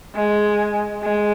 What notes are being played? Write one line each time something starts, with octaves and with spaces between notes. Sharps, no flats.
G#3
G#3